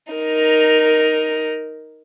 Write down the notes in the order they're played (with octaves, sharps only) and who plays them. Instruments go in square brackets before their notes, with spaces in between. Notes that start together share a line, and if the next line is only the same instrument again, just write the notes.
[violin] D#4 A#4